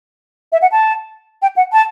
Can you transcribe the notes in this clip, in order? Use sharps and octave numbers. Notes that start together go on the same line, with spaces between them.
E5
F#5
A5
G5
F#5
A5